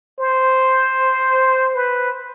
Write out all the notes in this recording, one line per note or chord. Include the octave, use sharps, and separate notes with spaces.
C5
B4